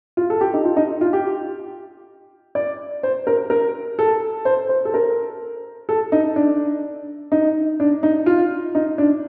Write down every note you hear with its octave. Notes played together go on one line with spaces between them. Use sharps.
F4
A4
G4
D#4
F4
D#4
F4
G4
D5
C5
A#4
A#4
A4
C5
C5
A4
A#4
A4
D#4
D4
D#4
D4
D#4
F4
D#4
D4